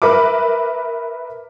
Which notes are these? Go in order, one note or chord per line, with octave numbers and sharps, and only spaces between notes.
A#4 B4 E5 D6